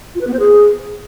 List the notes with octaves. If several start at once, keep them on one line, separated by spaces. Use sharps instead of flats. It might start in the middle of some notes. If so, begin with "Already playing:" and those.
F4
B4
B3
C5
G#4